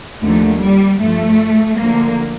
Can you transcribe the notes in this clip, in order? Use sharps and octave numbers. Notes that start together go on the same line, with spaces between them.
D#2 D3 F3 A3
G3
G2 F3 A3
D2 D3 F3 A#3